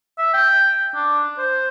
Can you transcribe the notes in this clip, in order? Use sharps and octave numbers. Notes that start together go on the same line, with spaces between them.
E5
G5
D4
C5